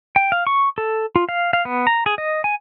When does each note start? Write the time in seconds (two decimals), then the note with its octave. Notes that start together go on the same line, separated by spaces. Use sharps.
0.16 G5
0.32 F5
0.47 C#6
0.78 A4
1.16 F4
1.29 F5
1.53 F5
1.65 B3
1.87 A#5
2.06 G#4
2.18 D#5
2.44 G#5